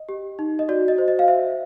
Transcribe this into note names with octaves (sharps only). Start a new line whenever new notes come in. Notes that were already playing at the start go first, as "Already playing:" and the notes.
Already playing: D#5
G4
D#4
D#5
F#4 D5
D#5
C5
D#5
F5
C5 E5